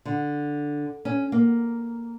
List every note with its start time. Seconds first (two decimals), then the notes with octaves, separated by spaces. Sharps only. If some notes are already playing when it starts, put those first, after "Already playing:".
0.05 D3
1.05 C#4
1.32 A#3